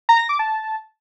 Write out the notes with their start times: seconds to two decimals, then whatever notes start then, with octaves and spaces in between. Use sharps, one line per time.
0.09 A#5
0.19 A#6
0.29 D6
0.39 A5